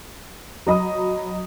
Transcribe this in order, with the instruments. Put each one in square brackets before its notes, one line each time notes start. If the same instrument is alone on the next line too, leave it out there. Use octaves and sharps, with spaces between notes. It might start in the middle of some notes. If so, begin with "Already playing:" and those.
[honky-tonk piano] F#3 D#5 B5 D#6